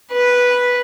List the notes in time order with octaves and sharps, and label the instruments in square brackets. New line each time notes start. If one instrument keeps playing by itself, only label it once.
[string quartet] B4